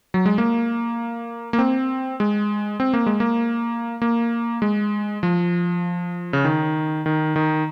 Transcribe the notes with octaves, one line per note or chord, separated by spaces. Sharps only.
F#3
G#3
A#3
A#3
C4
G#3
C4
A#3
G#3
A#3
A#3
G#3
F3
C#3
D#3
D#3
D#3